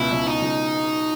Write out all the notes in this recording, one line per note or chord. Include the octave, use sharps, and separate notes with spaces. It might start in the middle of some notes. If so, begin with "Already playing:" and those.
Already playing: C#2 B2 E4
C#2
D#4
C#2